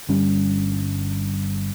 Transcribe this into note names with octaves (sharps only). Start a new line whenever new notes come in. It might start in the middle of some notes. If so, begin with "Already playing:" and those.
G1 G3 C#4